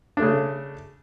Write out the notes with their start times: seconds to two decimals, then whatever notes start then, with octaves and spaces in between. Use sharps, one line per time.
0.17 D4
0.20 A3
0.22 C#3